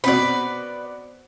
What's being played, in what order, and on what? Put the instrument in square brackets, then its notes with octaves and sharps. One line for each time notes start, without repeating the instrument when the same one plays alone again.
[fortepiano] B2 B3 C4 [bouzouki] B4 D5